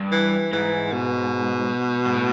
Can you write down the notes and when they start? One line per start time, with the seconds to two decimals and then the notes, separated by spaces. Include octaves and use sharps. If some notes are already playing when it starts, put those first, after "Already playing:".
Already playing: G2
0.12 E3
0.52 G#2 E3
0.93 B2
2.06 G#2
2.14 A2